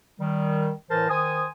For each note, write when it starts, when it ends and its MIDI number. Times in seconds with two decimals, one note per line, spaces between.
0.20 0.70 51
0.20 0.70 55
0.89 1.08 45
0.89 1.08 52
0.89 1.08 70
0.89 1.08 72
0.89 1.08 81
1.08 1.46 51
1.08 1.46 72
1.08 1.46 80
1.08 1.46 87